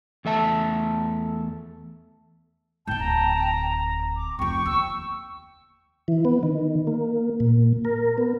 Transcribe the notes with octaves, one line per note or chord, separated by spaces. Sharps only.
E2 A3 E5 A5
G#2 D#4 G5 A5 G6
D1 A#5
D6
F1 F3 G5 C#6
D#2 E6
E3
B3
D#3
A#3
A#2
A#4
B3